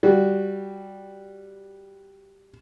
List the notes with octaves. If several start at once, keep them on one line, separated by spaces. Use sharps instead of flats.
G3 F#4